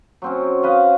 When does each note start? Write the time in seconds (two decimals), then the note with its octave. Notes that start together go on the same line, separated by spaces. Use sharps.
0.22 F#3 C4 C#4
0.63 B4 D#5 F5